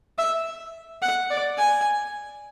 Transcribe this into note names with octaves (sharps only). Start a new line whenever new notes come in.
E5
F#5
D5
G#5